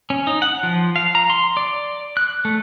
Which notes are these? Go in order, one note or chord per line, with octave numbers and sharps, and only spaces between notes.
C#4
D#4
F#5
F3
F5
A#5
C6
D5
F#6
A3